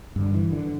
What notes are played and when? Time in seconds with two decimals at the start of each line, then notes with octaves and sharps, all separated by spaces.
0.16 G2 D3
0.34 E3
0.52 D3